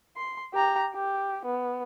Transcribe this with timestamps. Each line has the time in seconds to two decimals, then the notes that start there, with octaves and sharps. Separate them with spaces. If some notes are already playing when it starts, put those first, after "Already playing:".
0.17 C6
0.54 G4 A#5
0.94 G4
1.45 B3